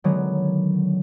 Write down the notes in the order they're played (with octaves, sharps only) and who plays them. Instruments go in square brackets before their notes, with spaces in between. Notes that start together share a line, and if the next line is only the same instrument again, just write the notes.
[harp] D3 D#3 F#3 G#3 B3